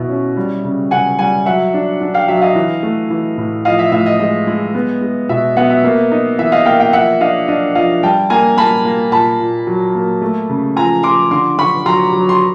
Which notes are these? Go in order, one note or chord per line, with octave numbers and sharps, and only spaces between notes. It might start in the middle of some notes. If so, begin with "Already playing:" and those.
Already playing: B2 E4
C#4
G3
C#3
C#3 F#5 G#5
G3 F#5 G#5
F#3 E5 F#5
D4
D4
F5 G5
F#3 E5
D#5 F5
E3
A3
E3
A2
F3 D#5 F5
E5
A2 E5
D#5
G#3 D#5
G#3
B3
G#3
B2 E5
B3 E5 F#5
E5
A#3 E5
D#4
E3 E5
D#5 F5
A#3 F5 G5
F5 G5
F3 E5 F#5
D4 D#5 F5
D4 D#5
F3 D#5 F5
G3 G5 A5
A#3 G#5 A#5
A#3 A5 B5
A#3
A#2 A5 B5
A#2
F#3
A#3
A3
C#3
F3 G#5 A#5
F3 C6 D6
D3 C6 D6
D3 B5 C#6
F#3 A#5 C6
F#3
C6